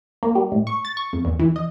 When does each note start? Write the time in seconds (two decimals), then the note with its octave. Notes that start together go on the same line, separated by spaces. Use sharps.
0.23 A#3
0.35 G3
0.52 A2
0.67 C#6
0.85 A6
0.97 C#6
1.13 F2
1.25 E2
1.39 E3
1.56 D#5